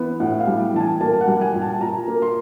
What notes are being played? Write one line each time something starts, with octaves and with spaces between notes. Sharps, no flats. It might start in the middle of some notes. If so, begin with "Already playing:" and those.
Already playing: E3 B3
A2 F#5
F5
G3
E3 A5
G#5
A#3 A5
F#5
G3
G#5
A#2
A5
A#2 A#5
A#3
C6